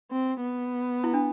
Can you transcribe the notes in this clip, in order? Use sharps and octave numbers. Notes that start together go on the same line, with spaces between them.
C4
B3
E4
D4